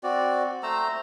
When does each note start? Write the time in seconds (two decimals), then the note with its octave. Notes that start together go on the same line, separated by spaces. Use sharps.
0.03 C4 F#4 D5
0.63 A3 C5 A#5 E6